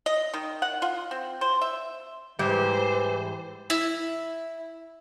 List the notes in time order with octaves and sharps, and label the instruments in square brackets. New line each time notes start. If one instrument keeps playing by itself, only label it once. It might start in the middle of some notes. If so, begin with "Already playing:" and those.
[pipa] D#5
D#3
F#5
F4
C4
C5
E5
[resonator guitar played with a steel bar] G#2 G3 [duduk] E3 [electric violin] C5
[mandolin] E4